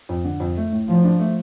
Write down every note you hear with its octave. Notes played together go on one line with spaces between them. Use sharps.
F2
D3
F2
A3
A2
A2 F3
D4
A3